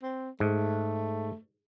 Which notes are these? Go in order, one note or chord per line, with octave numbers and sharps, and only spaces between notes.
C4
G#2 A3